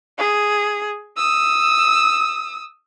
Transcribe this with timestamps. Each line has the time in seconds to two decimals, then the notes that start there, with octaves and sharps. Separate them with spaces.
0.18 G#4
1.17 D#6 E6